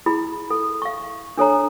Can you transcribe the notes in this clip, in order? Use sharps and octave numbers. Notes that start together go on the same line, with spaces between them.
E4 G#4 B5
A4
F5 C#6
D4 A4 C#5 A#5